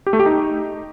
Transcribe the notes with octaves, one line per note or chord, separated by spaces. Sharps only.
G4
A3
G4
D#4